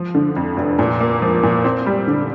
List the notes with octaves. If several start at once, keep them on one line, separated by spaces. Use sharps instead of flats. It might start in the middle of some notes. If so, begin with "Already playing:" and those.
Already playing: F3
D3
F2
F1
A#2
A#3
F3
A#2
C4
G3
D3